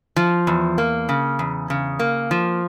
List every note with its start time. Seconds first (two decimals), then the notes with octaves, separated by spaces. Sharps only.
0.16 F3
0.47 E2
0.78 A#3
1.09 C#3
1.39 E2
1.70 C#3
1.99 A#3
2.31 F3